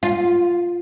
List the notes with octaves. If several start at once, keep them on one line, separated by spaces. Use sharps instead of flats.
F4